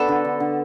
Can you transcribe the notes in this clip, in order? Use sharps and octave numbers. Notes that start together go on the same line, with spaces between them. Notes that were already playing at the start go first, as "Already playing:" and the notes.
Already playing: B3 D4 F#4 A4 B4
D3
D3
D3